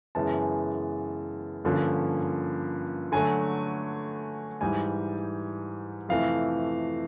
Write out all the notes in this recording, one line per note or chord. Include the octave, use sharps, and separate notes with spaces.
F#2 C#3 E3 G#3 B3 A5
G2 D3 F3 A#3 C#4
D3 F#3 A3 G#5
G#2 E3 G3 G#5
F2 C3 E3 A3 F5